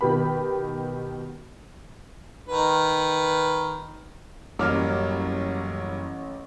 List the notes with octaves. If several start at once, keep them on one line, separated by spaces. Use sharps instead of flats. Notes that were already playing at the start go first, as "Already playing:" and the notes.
B2 D#3 B3 G4 B4 B5
D#3 B4
A1 F#2 F#3 G3 A#3 D6 F6